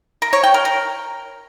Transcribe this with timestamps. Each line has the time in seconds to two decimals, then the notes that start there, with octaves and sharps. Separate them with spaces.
0.22 A#4
0.33 C#5
0.43 G5
0.54 A#4
0.65 A#4